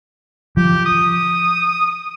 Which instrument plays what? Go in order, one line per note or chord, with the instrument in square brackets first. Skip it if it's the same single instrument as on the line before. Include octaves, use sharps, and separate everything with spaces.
[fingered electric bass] F3 [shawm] G4
[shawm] D#6